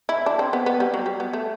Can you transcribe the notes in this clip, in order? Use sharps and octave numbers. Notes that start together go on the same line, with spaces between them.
E4
D4
C4
B3
B3
G3
F#3
G3
B3
A3